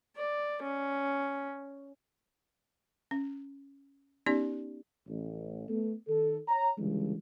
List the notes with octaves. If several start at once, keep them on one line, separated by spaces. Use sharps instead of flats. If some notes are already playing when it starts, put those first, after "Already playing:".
D5
C#4
C#4
B3 C#4 D#4 G4 D5
A1
A3 B3 A4
D#3 A4
C#5 A#5
C#2 D3 E3 G3 G#3